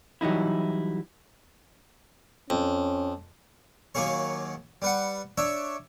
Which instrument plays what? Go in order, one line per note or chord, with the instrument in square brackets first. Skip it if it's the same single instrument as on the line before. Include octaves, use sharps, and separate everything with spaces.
[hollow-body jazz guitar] E3 F#3 G3 D#4 E4
[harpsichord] F2 [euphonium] C#4
[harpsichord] D#2 F#3 A#3 G#4 C#5
G3 B4 F#5
D4 C#5 E5